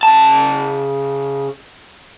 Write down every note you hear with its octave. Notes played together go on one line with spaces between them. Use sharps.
C#3 A5